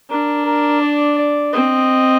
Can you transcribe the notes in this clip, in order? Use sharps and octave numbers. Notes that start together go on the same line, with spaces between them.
D4 A#4
A#4
D5
D5
C4 D#5